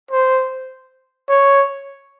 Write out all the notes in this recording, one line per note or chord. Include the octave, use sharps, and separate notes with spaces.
C5
C#5